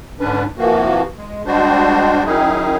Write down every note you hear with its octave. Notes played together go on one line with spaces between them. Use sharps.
G#2 D3 C#4 D4 B4
C3 E3 F3 A#3 F#4
G#3
G3 G#3 D4 F#4 C5
D#3 F#3 C#4 D#4 E4 G#4